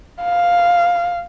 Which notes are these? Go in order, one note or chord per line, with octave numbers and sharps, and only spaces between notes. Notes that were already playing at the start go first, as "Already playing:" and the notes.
F5